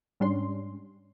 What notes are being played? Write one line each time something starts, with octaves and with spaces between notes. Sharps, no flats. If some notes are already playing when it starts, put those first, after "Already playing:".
G#2 G3 C#4 D4 C6